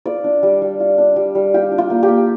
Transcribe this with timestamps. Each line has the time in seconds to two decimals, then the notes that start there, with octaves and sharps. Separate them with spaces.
0.06 F4 D5
0.24 D4
0.43 G3
0.62 G3
0.80 F4
0.98 D4
1.16 G3
1.35 G3
1.54 F4 G4
1.72 D4
1.78 F4
1.90 A#3
2.03 G4
2.08 A#3